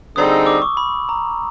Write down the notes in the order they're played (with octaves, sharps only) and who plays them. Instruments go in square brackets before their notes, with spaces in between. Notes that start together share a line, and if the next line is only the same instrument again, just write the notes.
[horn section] D3 G3 C4 D#4 G#4 [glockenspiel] D#6
[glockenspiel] E6
D6
C#6
B5
A#5